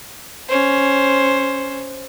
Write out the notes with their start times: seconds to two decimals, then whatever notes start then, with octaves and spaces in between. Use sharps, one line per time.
0.48 C#4 C5